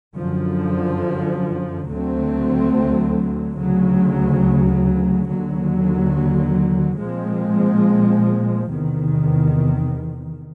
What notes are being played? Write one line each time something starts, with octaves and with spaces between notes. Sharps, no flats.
F#2 D3 F3
D2 D3 F#3 A3 C4
D2 C#3 F#3
D#2 D3 F#3
A#2 F3 G#3 C4
E2 C3 D#3